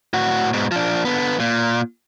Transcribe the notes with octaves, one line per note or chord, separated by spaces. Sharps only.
A2 F#4
G#2 B2
F3 D4
D3 B3
A#2